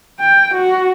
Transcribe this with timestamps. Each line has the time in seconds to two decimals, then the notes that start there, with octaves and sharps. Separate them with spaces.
0.20 G5
0.54 F#4